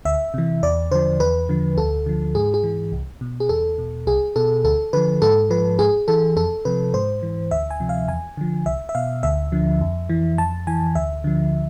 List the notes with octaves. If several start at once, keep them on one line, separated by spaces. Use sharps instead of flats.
D2 E5
C3 E3
E2 D5
D3 F3 C5
E2 B4
D3 F3
D2 A4
D3 F3
G#2 G#4
G#4
E3
C2
B2
G#4
E2 A4
B2
C2 G#4
B2 A4
D2 A4
D3 F3 B4
G#2 A4
F3 B4
G#2 G#4
E3 A4
F2 A4
C3 F3 B4
G#2 C5
E3
D2 E5
G#5
C3 F3
F5
E2 G#5
D3 F3
C2 E5
E5
B2 F5
D2 E5
D3 F3
F2
E3
F2 A5
E3 G#5
D2 E5
D3 F3